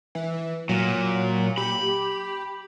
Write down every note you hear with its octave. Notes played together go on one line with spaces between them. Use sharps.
E3
A#2 F#3
G4 B5